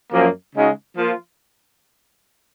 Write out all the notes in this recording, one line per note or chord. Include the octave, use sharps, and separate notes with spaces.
F#2 F3 A#3
C#3 G#3 D#4 F#4
F3 A#3 F4